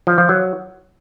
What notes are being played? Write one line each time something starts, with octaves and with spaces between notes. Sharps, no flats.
F3
F3
F#3